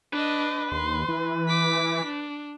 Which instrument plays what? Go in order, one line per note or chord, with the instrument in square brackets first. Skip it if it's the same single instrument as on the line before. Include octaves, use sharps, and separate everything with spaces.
[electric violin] D4 D#5 [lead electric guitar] B4
[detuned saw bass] D#2 [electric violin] C6
[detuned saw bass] E3
[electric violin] D6 B6
D4